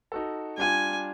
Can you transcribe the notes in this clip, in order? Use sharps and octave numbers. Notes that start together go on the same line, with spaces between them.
D#4 F#4 A4
G3 D4 F4 G#5